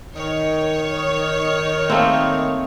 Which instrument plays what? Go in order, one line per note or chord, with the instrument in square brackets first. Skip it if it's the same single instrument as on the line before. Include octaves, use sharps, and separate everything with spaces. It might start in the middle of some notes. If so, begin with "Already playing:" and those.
[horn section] D#3 [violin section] C#5
[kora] A3 A#3 C4